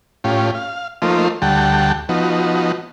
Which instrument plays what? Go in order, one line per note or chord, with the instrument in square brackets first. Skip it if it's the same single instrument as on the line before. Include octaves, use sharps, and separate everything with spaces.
[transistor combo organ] A2 C#4 F4 G4
F5
F3 A3 A#3 D#4 F4 C5
D2 G3 F#5 G5 A5
F3 B3 D#4 F#4